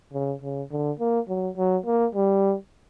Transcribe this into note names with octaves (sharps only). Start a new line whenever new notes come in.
C#3
C#3
D3
A#3
F#3
F#3
A#3
G3